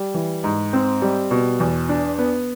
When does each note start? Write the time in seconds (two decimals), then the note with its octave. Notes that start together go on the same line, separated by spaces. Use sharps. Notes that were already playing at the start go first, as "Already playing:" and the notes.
Already playing: G3
0.14 E3
0.44 G#2
0.73 C4
1.02 G3
1.31 B2
1.60 E2
1.89 D4
2.18 B3